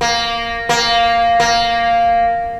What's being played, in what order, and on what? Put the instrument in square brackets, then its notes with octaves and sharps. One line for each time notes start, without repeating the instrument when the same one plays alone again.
[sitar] A#3
A#3
A#3